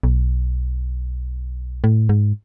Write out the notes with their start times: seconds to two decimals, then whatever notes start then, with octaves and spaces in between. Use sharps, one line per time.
0.03 B1
1.84 A2
2.09 G#2